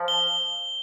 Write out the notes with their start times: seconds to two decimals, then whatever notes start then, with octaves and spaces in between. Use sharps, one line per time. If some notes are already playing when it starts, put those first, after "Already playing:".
Already playing: F3
0.08 G7